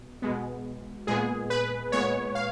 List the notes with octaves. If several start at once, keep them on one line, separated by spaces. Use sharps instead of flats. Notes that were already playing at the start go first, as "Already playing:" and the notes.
Already playing: B2
B2 G#3 B3
A#2 G#3 B3 G#4
B4
A#2 G#3 B3 C#5
F5